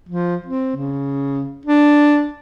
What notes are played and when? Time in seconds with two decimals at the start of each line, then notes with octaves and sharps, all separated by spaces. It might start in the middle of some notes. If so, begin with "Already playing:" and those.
0.09 F3
0.46 C4
0.76 C#3
1.66 D4